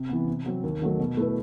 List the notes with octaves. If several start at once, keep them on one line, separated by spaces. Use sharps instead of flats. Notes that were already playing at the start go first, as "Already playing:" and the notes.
Already playing: C3
E3 B3
C3
F#3 C4
D#2
D#3 F#3 A3
B2
A3 E4 B4